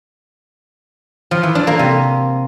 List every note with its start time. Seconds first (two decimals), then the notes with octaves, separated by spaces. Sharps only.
1.31 F3
1.43 E3
1.55 D4
1.67 A#3
1.79 C3